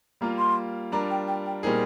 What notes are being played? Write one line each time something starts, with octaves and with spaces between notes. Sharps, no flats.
G3 A#3 F4 A#5
C6
G3 D4 F4 A#4 A#5
G5
G5
G5
A#2 G3 C4 D#4 G#4 A#4